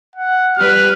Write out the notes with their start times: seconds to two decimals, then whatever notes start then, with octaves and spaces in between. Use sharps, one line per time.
0.16 F#5
0.58 G3 B4 F6